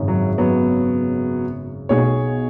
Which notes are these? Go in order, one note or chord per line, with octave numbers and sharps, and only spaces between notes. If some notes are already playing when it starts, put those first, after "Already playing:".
Already playing: G#1 F#2 C#3
F#3
F#3 B3
B1 B2 B3 G#4 C#5